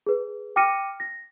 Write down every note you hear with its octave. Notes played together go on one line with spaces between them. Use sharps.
G#4 B4
G5 D6 F6 A#6 C#7 D#7
A#6